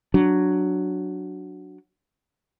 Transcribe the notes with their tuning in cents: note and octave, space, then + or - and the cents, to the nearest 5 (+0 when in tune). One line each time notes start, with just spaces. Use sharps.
F#3 +0 D4 +0